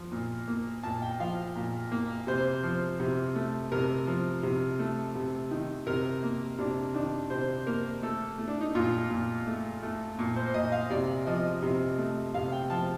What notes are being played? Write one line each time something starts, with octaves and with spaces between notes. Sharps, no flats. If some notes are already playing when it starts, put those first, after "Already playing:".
Already playing: F3
A#2
A#3
A#2 A5
G5
F3 F5
A#2
A#3
C3 C5
F3
C3
A3
C3 A#4
F3
C3
A3
C3
D#3
C3 A#4
A#3
C3 D4
D#3 D4
C3 C5
A#3 A#4
A3 A4
A3
D4
D#4
A#2 F4
A#2
A3
A3
A#2
C5
A#2 D#5
F5
C3 D5
F3 D#5
C3
A3
C3 F5
G5
F3 A5